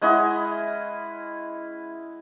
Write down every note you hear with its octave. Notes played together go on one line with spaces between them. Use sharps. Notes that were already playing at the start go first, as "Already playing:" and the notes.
G#3 C#4 E4 D#5 F#5